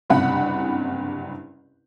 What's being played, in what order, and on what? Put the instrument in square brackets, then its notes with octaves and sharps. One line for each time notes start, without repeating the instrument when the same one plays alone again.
[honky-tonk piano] F#1 C2 G2 F#5 B5